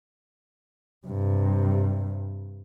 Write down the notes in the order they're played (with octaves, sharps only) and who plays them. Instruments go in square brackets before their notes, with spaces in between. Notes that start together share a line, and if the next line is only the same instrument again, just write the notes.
[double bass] G2 C3